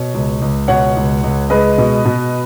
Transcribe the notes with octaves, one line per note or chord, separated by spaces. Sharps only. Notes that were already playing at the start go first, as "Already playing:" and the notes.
Already playing: B2 C#5
C#2
C#2
B2 C#5 F#5
C#2
C#2
G#3 B4 D#5
B2
B2